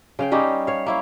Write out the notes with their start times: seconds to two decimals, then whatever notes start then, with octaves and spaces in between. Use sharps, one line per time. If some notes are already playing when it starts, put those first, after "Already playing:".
0.19 C#3 F5 G5
0.32 G3 C#4 D#4 G4
0.67 C#5 F5
0.86 A#3 E4 C#5